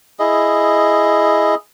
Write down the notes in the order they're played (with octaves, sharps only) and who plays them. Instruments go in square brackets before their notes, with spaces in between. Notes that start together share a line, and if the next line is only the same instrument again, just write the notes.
[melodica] E4 G#4 D#5